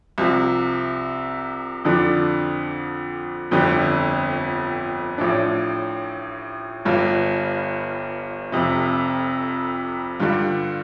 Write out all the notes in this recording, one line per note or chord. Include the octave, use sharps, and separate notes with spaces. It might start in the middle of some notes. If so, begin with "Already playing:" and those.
C2 C3 F3
F2 D3 F3 D4
G1 F2 D3 G3
A1 A2 F3 D4
G1 G2 G3 F4
F1 F2 C3
G2 D3 G3 F4